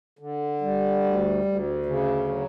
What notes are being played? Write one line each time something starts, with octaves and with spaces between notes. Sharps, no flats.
D3
G3
D2
D2
C#3
F#3